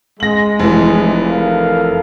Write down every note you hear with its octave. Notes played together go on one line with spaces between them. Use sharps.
G#3 A#6 F#7
F1 E3
A4 A#4 F5